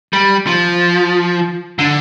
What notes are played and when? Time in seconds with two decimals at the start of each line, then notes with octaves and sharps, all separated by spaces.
0.13 G3
0.47 F3
1.79 D3